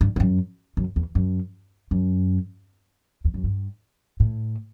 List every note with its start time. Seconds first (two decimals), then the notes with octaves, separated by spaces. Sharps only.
0.01 G2
0.16 G2
0.20 F#2
0.77 F#2
0.96 E2
1.15 F#2
1.91 F#2
3.25 E2
3.34 F#2
3.44 G2
4.20 A2